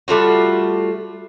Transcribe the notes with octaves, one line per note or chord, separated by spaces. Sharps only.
G3 A3 F4 F#4